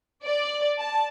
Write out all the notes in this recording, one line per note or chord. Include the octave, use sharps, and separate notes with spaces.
D5
A5